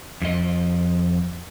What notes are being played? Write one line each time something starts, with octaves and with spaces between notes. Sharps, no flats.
F2 D#5